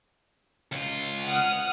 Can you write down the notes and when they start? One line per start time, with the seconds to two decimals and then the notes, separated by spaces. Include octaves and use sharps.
0.72 C#2 F4
1.27 F#5 D#6 F6